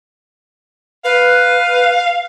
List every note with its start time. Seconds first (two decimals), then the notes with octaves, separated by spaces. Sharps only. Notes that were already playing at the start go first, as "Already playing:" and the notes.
1.04 B4 F5